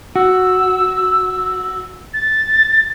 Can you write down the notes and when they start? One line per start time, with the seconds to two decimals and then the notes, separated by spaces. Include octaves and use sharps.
0.16 F#4 E6
2.14 A6